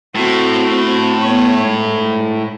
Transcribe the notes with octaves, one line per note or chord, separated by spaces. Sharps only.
A2 C4 F#4
B3 C#5
G#2